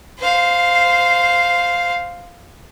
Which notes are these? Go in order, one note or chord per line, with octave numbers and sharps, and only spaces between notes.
C5 F5